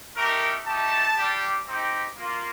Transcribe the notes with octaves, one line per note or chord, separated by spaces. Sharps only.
A3 D#4 G4 A#4
A3 D#4 G4 A5
G3 D4 G4
C4 D#4 G4
A#3 F4